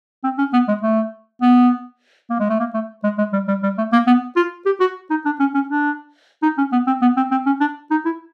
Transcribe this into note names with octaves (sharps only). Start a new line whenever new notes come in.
C4
C#4
B3
G#3
A3
B3
A#3
G#3
A3
A#3
A3
G#3
G#3
G3
G3
G3
A3
A#3
B3
F4
G4
F#4
D#4
D4
C#4
C#4
D4
D#4
C#4
B3
C4
B3
C4
C4
C#4
D4
D#4
E4